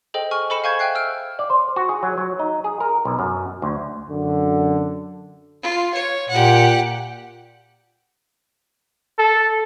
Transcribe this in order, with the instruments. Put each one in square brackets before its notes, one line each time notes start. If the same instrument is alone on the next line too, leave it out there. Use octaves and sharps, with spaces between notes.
[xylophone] G#4 A4 C5 D#5 G5
G#5 C#6 F6
A4 C5 D#5 B5 C#7 E7
F5 G#5 C#6 G6 G#6
E5 F5 G5 F#6 C7
E6 F6 D7
[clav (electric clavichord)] D5
C5
F#4
G#4
F#3
F#3
D#4
G#4
A#4
B1
F#2
D2
[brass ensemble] F#2 D3
[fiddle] F4
C#5
[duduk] A#2 [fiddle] G4 F#5
[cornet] A4